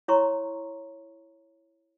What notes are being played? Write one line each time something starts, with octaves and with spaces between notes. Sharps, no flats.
E4 C#5 A#5 C6 C#6